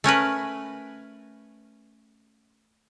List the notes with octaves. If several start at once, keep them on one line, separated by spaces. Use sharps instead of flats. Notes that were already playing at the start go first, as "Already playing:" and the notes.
A3 C#4 A#4 B4